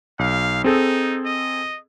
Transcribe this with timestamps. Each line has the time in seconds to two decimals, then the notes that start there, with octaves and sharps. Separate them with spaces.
0.19 B1 F5
0.64 C4 D#4 G#4 A4
1.26 D#5